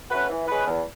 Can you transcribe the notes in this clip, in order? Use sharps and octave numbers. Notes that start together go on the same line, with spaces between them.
A3 C#4 F#4 B4
E3
G#3 C#4 G#4 B4
E2